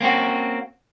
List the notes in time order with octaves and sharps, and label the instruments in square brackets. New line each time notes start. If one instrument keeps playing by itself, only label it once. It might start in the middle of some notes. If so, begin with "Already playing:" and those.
[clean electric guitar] A#3 C4 C#4 F#4